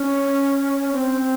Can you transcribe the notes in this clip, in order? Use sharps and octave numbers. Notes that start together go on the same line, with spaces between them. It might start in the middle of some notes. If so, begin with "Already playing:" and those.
Already playing: C#4
C4